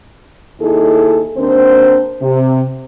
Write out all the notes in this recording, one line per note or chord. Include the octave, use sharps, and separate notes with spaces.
D#2 D#4 E4 G#4 A4
D#2 C4 D4 A#4 C5
C3